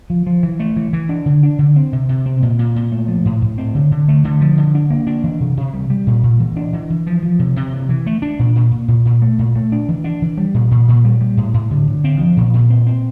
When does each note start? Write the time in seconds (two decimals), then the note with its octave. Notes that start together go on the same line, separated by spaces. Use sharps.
0.10 F3
0.27 F3
0.43 E3
0.60 A3
0.76 E3
0.93 E3
1.09 D4
1.26 D3
1.43 D4
1.59 D3
1.76 C4
1.93 C3
2.09 C3
2.26 C4
2.42 A#2
2.59 A#2
2.76 A#2
2.92 A3
3.08 F3
3.25 A2
3.42 A2
3.58 C4
3.75 D3
3.91 D3
4.08 A3
4.24 D3
4.41 F3
4.57 D3
4.75 D4
4.90 A#3
5.07 D4
5.24 E3
5.40 C3
5.57 C3
5.74 G3
5.90 G3
6.07 A#2
6.23 A#2
6.40 E3
6.57 D4
6.73 E3
6.90 E3
7.07 F3
7.23 F3
7.39 C3
7.56 C3
7.73 E3
7.89 E3
8.06 A3
8.22 D4
8.39 A#2
8.55 A#2
8.72 A#2
8.88 A#2
9.05 A#2
9.22 A3
9.39 A#2
9.55 A3
9.72 D4
9.89 E3
10.04 D4
10.22 E3
10.37 G3
10.54 A#2
10.71 A#2
10.88 A#2
11.05 G3
11.21 G3
11.37 A2
11.54 A2
11.71 D3
11.87 D3
12.04 C4
12.20 F3
12.37 A#2
12.54 A#2
12.70 C4
12.87 C4